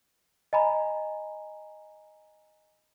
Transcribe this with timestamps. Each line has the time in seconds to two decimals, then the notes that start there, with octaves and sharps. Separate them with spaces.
0.53 D#5 G#5 A#5 B5